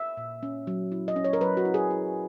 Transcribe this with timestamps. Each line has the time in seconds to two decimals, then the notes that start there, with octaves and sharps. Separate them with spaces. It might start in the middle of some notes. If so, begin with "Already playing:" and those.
Already playing: E5
0.17 A#2
0.43 C#4
0.67 F#3
0.92 E4
1.08 D#5
1.16 C#4
1.24 C#5
1.33 A#4
1.41 F#3 B4
1.57 F#4
1.65 E4
1.74 G#4
1.91 E4